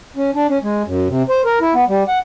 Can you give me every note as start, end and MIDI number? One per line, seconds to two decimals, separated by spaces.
0.16 0.31 61
0.35 0.47 62
0.49 0.58 61
0.63 0.83 56
0.86 1.08 42
1.08 1.23 48
1.29 1.42 72
1.45 1.59 70
1.61 1.74 64
1.74 1.85 59
1.89 2.03 55
2.08 2.19 78